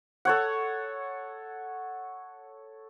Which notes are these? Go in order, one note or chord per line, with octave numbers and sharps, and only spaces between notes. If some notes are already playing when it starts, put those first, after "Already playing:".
A4 C#5 F#5